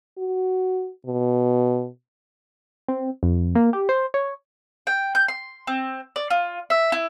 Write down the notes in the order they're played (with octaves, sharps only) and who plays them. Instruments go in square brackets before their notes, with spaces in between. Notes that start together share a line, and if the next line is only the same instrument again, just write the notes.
[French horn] F#4
B2
[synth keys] C4
F2
A#3
G4
C5
C#5
[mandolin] G5
G6
C6
C4
D5
F4
E5
E4